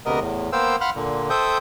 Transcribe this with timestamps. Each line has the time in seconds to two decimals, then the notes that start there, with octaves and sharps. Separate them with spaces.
0.06 D2 C3 B3 A#4 D#5
0.20 E2 A2
0.53 A#3 B3 C5 F5 G5 E6
0.81 F5 F#5 B5 C6 F6 F#6
0.96 A#2 D3
1.30 A4 C5 E5 G5 D#6 G6